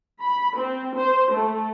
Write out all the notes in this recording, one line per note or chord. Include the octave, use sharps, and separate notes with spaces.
B5
C4
C5
A3